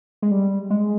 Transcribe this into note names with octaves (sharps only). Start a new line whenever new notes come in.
G#3
G3
G#3